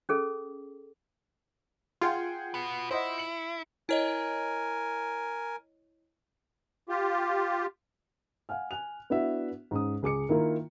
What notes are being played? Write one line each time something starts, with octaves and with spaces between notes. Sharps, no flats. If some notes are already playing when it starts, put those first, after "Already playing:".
C#4 G#4 A4
F4 G#4 F#5 G5
F#4 B4
E4 C5 D#5 F#5
C#7 F#7
E4 A#4 C#5 D#5 G#5
F4 G4
F5 F#5 G#5 F6
G#5 F#6 F7
B3 D4 E4 F#4 E5
G#2 C#4 D#6
C#2 G#4 D6 C#7
D#3 A#3 E4 F4 A#4